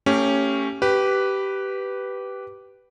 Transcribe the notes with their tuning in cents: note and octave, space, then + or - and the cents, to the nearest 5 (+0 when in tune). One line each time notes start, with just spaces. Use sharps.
A3 +35 C#4 +0 G4 +0
G4 -15 B4 +0